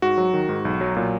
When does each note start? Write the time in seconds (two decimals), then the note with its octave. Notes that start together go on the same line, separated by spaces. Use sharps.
0.02 G#2 F#4
0.18 F#3
0.34 D#3
0.49 G#2
0.65 B1
0.81 F#3
0.96 A#2